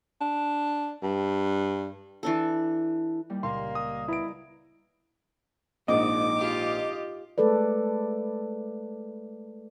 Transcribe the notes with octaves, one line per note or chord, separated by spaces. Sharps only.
D4
G2
E3 D4 A4
D#2 G3
C#2 A#2 C#3 A#3 C6
D#6
B3 E4 A#5 D7
A#1 G#2 D#5 D6
F4 G4
G#3 A3 A4 B4 D5